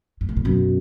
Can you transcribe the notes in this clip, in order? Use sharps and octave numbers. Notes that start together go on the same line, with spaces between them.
G#2
A2
A#2
F#2 B2